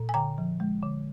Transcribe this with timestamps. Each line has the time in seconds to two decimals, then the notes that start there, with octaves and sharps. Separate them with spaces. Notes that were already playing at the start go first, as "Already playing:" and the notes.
Already playing: A#2
0.09 G#5
0.14 D3 G5 A#5
0.38 F3
0.60 G#3
0.83 D3